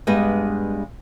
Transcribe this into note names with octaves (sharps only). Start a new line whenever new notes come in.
G2 G3 G#3 B3 D#5